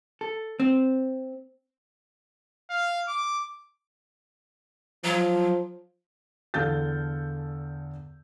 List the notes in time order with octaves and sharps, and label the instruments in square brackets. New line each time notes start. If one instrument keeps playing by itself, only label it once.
[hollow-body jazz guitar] A4
C4
[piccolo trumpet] F5
D6
[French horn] F3 [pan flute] F#3
[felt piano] E2 D3 A4 F5 G6 A6